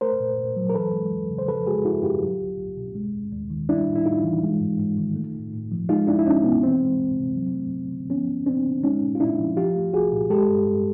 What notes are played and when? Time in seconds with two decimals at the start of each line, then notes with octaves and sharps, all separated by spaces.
0.01 A3 A#4 C5
0.20 A#2
0.38 A#2
0.56 F#3
0.70 A#4
0.74 E3 A4 B4
0.94 G#3
1.12 E2
1.30 C#3
1.39 C5
1.48 F3 A4 B4
1.67 G#3 F#4 G#4
1.85 G2 E4 F#4
2.03 D3 F4 G4
2.21 F#3
2.40 C2
2.59 C2
2.77 B2
2.95 G#3
3.14 D#2
3.32 D#2
3.50 D#3
3.69 G3 D4 E4
3.87 A2
3.95 E4
4.06 A2 D#4 F4
4.24 E3
4.43 G#3
4.61 G#2
4.79 G#2
4.98 D#3
5.16 A3
5.35 A2
5.53 A2
5.72 F3
5.89 G#3 D#4 F4
6.07 C2 D4 E4
6.19 E4
6.26 C2 C#4 D#4
6.44 B2 B3
6.63 E3 C4
6.81 G#3
6.99 D2
7.18 C3
7.36 F#3
7.55 A3
7.73 F2
7.92 D3
8.10 F3 B3 C#4
8.28 D2
8.46 D2 C4 D4
8.65 D3
8.83 G#3 C#4 D#4
9.02 A#2
9.15 F4
9.20 A#2 D4 E4
9.38 F3
9.57 F3 F4 G4
9.75 A3
9.94 C2 F#4 G#4
10.12 A#2
10.30 G#3 G4 A4
10.49 G2
10.67 G2